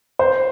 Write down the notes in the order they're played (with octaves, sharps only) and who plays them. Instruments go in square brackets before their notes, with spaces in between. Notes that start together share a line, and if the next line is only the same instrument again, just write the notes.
[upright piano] C5